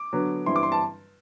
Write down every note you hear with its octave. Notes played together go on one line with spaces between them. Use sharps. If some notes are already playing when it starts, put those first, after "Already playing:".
Already playing: D6
D3 F#3 B3 D4
G2 E3 G3 C4 E4 C6
D6
C6
A5